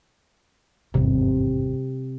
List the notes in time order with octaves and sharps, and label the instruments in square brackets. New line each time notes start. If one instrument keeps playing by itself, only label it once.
[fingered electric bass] G#1 E2 G2 [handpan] C3